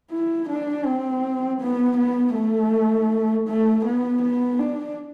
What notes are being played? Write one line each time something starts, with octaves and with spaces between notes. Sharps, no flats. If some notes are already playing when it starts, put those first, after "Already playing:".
E4
D4
C4
B3
B3
A3
A3
B3
B3
D4